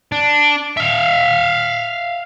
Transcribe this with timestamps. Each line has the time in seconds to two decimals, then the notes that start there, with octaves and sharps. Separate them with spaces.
0.12 D4
0.77 E5 F5